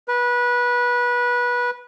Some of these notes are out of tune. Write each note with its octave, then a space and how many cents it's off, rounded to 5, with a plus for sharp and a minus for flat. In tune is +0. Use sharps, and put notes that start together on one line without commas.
B4 -20